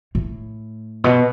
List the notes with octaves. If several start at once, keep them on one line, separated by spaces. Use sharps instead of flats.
A2
B2